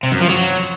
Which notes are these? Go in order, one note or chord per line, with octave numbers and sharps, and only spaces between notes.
C3
F#2
F3
F#3